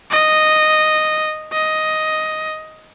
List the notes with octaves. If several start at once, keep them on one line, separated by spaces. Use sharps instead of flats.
D#5
D#5